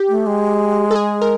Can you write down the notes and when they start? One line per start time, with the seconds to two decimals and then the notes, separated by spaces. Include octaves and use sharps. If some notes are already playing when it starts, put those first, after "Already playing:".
Already playing: G4
0.09 A3
0.27 G#3
0.91 A4
0.96 G#4
1.22 A#4